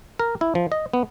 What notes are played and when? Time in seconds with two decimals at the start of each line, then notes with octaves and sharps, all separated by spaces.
0.19 A#4
0.41 E4
0.55 F3
0.72 D#5
0.94 B3